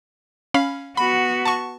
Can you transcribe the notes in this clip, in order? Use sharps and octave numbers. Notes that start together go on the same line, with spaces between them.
C#4 F5 B5
B3 F#4 B5
A5 C#6